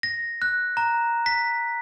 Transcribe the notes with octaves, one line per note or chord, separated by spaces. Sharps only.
A#6
F#6
A#5
B6